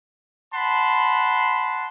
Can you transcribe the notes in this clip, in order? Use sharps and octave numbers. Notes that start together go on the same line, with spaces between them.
F#5 A5 B5 C6